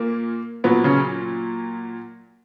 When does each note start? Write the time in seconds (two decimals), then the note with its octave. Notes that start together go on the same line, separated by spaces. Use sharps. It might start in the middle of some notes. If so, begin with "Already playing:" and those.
Already playing: A#2 A#3
0.64 A#2 F#3 B3
0.84 C#3 C#4